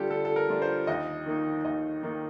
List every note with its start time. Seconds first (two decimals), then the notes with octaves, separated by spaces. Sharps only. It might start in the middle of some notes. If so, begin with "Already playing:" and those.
Already playing: D3 G3 D4 F4 G4 A4
0.10 D3 A4
0.25 A4
0.36 A#4
0.49 G3 D4 F4
0.62 C5
0.87 D#2 D#5
1.26 D#3 A#3 D#4
1.65 D#2 D#5
2.03 D#3 A#3 D#4